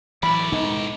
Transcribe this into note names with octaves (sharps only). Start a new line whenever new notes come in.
A2 E3 F#3 D5 B5
B2 G#3 D#4